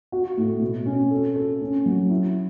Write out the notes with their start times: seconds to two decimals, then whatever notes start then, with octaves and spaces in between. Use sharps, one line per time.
0.12 F#4
0.37 A2
0.61 B2
0.86 C#4
1.11 A4
1.36 A4
1.61 C#4
1.86 F#3
2.10 E4